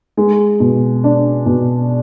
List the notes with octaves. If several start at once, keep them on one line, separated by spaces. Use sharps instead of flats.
G#3
B2
D4
B2